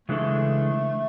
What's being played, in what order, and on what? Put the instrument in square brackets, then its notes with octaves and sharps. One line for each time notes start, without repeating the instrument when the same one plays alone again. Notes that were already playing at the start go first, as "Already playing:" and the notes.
[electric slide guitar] C#3 E3 G#3 D4 A4 [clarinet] A3